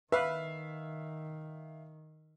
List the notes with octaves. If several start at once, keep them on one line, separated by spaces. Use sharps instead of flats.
D#3 B4 E5 F5